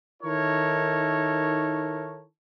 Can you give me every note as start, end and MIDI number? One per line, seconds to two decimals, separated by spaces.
0.23 2.23 51
0.23 2.23 63
0.23 2.23 64
0.23 2.23 69
0.23 2.23 70
0.23 2.23 73